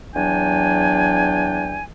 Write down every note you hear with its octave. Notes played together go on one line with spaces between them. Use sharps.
E2 F#3 D4 G5 G#5